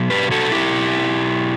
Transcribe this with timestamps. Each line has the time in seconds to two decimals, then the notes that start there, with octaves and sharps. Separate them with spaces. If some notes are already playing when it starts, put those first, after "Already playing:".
Already playing: B2 F#3
0.10 G4 B4
0.31 F#4 A4
0.52 E4 G4